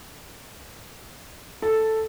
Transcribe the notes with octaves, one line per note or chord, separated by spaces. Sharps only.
A4